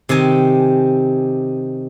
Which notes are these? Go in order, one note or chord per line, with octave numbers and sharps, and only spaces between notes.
C3 D#3 G4 G#5